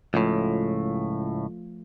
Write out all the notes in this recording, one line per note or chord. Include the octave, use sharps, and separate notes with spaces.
C#2 A2 F3 A3 F4